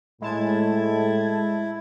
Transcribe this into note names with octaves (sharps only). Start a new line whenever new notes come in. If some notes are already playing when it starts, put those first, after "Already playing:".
A2 G#3 E4 A5 G#6